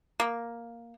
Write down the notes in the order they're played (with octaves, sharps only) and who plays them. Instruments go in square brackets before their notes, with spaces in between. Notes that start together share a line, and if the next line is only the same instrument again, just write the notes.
[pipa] A#3